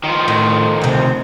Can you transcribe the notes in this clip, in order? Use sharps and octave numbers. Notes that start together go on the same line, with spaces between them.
D#3 F3
A2
D2 C3